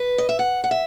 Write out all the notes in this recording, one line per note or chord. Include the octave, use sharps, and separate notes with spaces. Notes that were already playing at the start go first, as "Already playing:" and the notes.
Already playing: B4
D#5
E5
F#5
F#5
E5